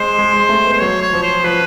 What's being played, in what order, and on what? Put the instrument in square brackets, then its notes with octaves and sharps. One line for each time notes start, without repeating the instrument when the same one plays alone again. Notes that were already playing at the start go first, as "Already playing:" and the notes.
Already playing: [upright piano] G#3 [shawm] C5
[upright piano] G#3
G#3
A3
B3
[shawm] C5
[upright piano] F#3 [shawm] C#5
[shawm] C#5
[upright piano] F3
[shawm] C5
[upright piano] F3 [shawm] B4